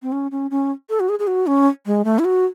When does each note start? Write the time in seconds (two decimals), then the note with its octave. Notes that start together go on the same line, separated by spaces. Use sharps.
0.02 C4
0.12 C#4
0.31 C#4
0.51 C#4
0.90 A4
1.00 F#4
1.09 G#4
1.19 G#4
1.27 F#4
1.47 C#4
1.86 G#3
2.05 A3
2.19 E4
2.25 F#4